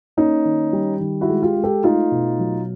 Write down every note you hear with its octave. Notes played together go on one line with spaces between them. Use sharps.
A#3 C#4 D#4
D#3
G3
D#3
E4 F#4
G#3
F4 G4
G#3
G4 A4
A3 D#4 F4
B2
F#3